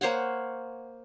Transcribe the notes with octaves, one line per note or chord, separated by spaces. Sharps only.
A#3 C5 C#5 F#5